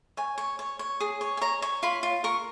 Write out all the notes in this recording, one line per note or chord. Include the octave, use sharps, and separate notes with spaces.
C#5 G#5
C#5
C#5
C#5
G#4
C#5
G#5
C#5 A#5
C#5
F4 B5
F4
A#4 C#6